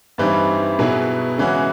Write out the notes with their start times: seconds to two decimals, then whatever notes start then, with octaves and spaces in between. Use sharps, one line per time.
0.18 G2 E3 G3 C4 D#4
0.79 B2 F#3 B3 E4 G#4
1.38 C#3 E3 G#3 C#4 F#4